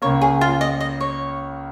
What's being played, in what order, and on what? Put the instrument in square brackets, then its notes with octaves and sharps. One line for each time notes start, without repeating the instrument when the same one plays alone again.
[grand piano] C#2 C#3 A#3 [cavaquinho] C#5
[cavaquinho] G#4
F4
D#5
D#5
C#5